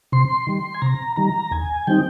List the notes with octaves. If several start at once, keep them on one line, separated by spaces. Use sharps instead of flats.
C3 C6
D#3 G3
G#5
C3 A#5
D#3 G3 A#5
D#2 G#5
D#3 G3 C4 D#4 G5